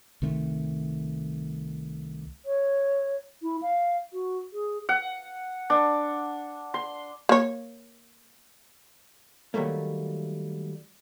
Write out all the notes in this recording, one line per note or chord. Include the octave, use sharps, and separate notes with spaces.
C2 D#3 A3 C4
C#5
E4
F5
F#4
G#4
F#5
D4
C6
A#3 C#5
D#3 F#3 G3 A3 A#3